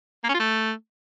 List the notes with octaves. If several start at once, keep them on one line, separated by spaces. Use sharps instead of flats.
A#3
C#4
F4
A3